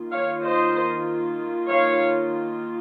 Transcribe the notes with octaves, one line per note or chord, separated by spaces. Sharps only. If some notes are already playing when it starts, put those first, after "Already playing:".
Already playing: D#3 A#3 F4
C#5 F5
C5 D#5
C#5 F5